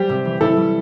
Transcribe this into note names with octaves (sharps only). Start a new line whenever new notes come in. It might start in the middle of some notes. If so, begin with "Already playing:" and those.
Already playing: G3 G4 C5
C3
E3
C3 E4 A4
G3